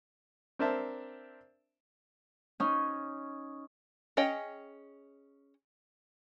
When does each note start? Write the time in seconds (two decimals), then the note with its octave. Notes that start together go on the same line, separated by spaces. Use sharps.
0.59 C4 D4 A#4 C5 E5 A5
2.60 C#4 D#4
4.17 C#4 G#4 C#5 D#5 G5